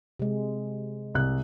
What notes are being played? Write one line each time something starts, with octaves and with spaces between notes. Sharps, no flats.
C3 G#3
C2 F#6